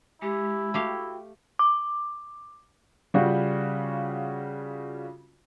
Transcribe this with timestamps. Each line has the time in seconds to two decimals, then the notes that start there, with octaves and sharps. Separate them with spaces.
0.22 G#3 E4 G4
0.74 A3 F#4 G4 F5 G5
1.59 D6
3.14 C#3 G3 F4 F#4